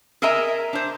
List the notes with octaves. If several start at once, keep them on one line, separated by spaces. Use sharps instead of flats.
G#4 A#4 D#5 E5 G#5 A#5
D4 C5